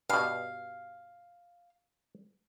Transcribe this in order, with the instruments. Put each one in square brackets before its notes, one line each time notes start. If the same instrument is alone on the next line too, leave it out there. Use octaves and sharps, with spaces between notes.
[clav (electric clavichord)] G2 B2 [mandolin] F5